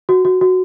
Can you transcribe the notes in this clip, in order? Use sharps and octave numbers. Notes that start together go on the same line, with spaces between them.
F#4
F#4
F#4